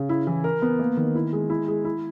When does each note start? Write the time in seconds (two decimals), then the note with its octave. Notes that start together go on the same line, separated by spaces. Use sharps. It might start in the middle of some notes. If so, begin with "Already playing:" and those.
Already playing: C#3
0.09 E4
0.27 E3
0.44 A#4
0.62 B3
0.79 A#3
0.97 D#3
1.15 E4
1.33 G#3
1.50 E4
1.68 G#3
1.85 E4